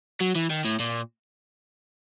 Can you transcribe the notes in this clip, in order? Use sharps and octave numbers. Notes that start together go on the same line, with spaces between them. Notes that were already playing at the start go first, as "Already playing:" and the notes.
F#3
E3
D#3
A2
A#2